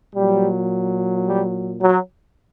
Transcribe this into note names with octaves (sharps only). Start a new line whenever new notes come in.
A#2 F#3 G3
G3
F#3